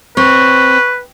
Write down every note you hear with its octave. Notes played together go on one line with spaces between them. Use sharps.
C4 B4 C#5